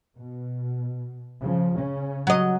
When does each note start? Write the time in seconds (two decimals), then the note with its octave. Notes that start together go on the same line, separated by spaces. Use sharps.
0.17 B2
1.41 C#3 F3
1.75 C#3 C#4
2.27 F#3 D#5